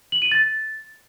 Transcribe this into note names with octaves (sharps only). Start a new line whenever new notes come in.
F#7
D#7
A6